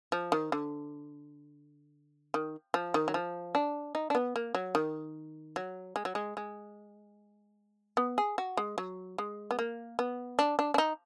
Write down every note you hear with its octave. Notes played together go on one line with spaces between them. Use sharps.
F3
D#3
D3
D#3
F3
D#3
F#3
F3
D4
D#4
D4
B3
A#3
F#3
D#3
F#3
G#3
F#3
G#3
G#3
B3
G#4
F#4
G#3
F#3
G#3
B3
A#3
B3
D4
D4
D4
D#4